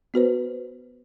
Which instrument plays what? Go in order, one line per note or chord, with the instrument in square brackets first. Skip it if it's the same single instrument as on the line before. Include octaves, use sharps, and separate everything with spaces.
[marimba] B3 F#4 B4 C5